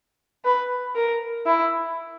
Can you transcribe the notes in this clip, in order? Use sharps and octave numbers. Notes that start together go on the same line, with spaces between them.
B4
A#4
E4